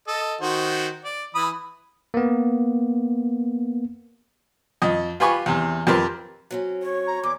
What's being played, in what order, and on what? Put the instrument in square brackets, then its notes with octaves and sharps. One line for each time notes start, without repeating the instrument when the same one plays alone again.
[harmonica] A4 D#5
D#3 F#4 C5
D5
E3 B5 D#6
[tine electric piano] A#3 B3
[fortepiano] F2 D#5
F4 G4 B4 G#5 B5 C#6
E2 C3
F2 C4 G4 A#4 B4 C6
[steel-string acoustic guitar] F#3 C4 C#4
[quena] C#5
[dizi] A#5
[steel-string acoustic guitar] E2 [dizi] D6